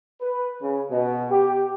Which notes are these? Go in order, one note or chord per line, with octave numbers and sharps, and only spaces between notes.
B4
C#3
B2
G4